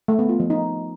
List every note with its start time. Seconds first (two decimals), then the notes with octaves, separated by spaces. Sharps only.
0.08 A3
0.19 B3
0.29 F4
0.40 F3
0.50 D#4